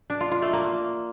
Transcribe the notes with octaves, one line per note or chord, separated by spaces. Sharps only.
D4
F4
F4
A3
A#3